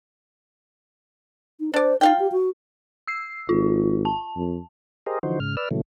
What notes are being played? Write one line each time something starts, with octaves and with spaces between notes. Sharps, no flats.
D#4
D4 C5 D5
D#4 F4 F5 G5
G4
F#4
E6 C7
G#1 F4
A5
F2
G4 G#4 A#4 C5 D#5
D3 E3 F3 D#4 F#4 C5
G#2 C#3 F6
B4 D5 E6 F6
A#2 C#3 E3 F#3 A3